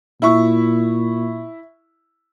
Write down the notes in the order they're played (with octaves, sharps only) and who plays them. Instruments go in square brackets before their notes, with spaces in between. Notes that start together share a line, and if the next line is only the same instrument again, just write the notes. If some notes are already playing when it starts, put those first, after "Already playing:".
[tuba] A#2 [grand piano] E4 E5 C#6